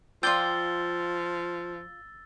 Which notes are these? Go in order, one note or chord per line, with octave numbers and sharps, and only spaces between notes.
F3 F4 D5 G5 E6 A6 G7